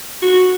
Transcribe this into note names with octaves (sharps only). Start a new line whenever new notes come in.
F#4